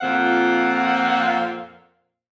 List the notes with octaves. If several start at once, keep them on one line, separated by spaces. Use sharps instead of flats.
F2 A#2 C4 F5 F#5